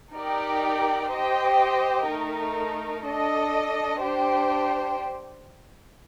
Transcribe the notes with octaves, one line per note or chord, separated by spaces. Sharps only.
D#4 G4 A#4 D5 G5
G4 C5 D#5 G5
A3 D#4 A#4
D4 A4 D#5
D4 G4 C5 G5